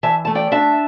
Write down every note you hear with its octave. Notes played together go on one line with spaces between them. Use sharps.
E3 E5 A5
A3 A5
D5 G5
D4 E5 A5